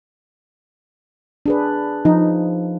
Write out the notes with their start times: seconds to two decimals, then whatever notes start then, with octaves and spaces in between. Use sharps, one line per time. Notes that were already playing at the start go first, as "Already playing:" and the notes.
1.46 D4 G#4 B4
2.05 F3 D#4